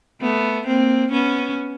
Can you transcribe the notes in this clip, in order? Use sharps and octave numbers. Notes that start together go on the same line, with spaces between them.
A3 B3
A#3 C4
B3 C#4